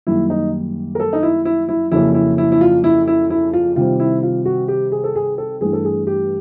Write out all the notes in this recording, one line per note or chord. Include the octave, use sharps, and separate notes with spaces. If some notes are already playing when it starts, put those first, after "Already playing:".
F#2 D#3 G3 A#3 E4
D#4
A#4
A4
D#4
E4
E4
E4
F2 C#3 F#3 A#3 C#4 E4
E4
E4
E4
F4
E4
E4
E4
F4
C3 D#3 G3 C4 F4
E4
F4
F#4
G4
G#4
A4
G#4
A4
G2 E3 A3 G#4
A4
G#4
G4